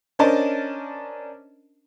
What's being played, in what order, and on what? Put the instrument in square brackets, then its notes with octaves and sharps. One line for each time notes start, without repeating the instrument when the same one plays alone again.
[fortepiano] C#4 D4 A#4 C5 D#5 A5